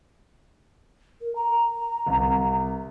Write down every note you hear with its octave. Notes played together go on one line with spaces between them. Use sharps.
A#4
A#5
C2